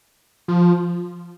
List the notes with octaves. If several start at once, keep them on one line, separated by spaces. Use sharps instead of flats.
F3